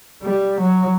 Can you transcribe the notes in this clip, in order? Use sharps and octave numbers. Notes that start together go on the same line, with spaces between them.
G3
F#3